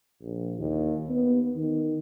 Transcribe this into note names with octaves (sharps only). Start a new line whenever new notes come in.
A#1
D#2
B3
D#3